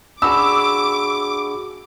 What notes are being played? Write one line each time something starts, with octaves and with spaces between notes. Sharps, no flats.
D4 F#4 G#4 B5 D6 E6